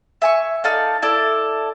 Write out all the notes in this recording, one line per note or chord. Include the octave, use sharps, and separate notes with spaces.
E5 G#5 C#6
D#4 A4 D5 F5
E4 A4 D5